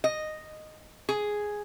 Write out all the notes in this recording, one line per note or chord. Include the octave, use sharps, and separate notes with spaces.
D#5
G#4